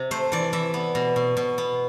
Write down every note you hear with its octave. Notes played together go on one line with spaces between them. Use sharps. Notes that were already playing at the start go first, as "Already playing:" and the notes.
Already playing: C3
A3 C5
E3 D5
E3 E5
B3
B2
B2
B2
B3